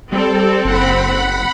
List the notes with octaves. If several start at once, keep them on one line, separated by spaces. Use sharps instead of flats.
G3 C4 A4
F#1 F#5 B5